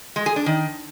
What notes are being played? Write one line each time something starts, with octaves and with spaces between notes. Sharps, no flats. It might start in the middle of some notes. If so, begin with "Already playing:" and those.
G#3
G#4
D4
D#3